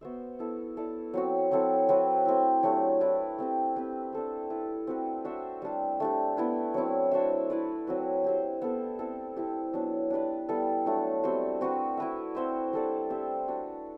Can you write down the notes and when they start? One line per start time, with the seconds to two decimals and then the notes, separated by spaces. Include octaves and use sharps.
0.01 B3 F#4 C5 E5
0.39 B3 E4 A4
0.77 E4 A4 D5
1.14 F#3 C4 F#4
1.51 F#3 C4 E4 A4
1.89 F#3 C4 E4 B4
2.25 A3 C4 E4
2.63 F#3 A3 D4 G4
3.01 E4 B4 D5
3.38 A3 C4 G4
3.76 C4 G4 B4
4.13 D4 A4 C5
4.50 E4 B4 D5
4.87 C4 F#4 B4
5.25 D4 F#4 C5 E5
5.62 G3 D4 G4
6.00 A3 D4 G4
6.37 B3 E4 B4
6.74 F#3 C4 E4
7.12 D4 F#4 C5 E5
7.50 E4 B4 D5
7.87 F#3 C4 F#4 B4
8.24 C4 G4 C5
8.62 B3 E4 A4 C5
8.99 C4 E4 A4
9.36 C4 E4 G4
9.73 F#3 B3 D4
10.10 D4 G4 B4 D5
10.49 G3 B3 E4 A4
10.86 F#3 A3 D4
11.23 G3 C4 F#4 C5
11.61 C4 F#4 B4
11.97 E4 B4 E5
12.35 C4 F#4 C5 E5
12.73 G3 D4 A4 D5
13.10 C4 G4 C5 E5
13.48 D4 F#4 B4